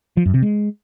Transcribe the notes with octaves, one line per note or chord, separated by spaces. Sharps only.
F3
F#2
C3
G#3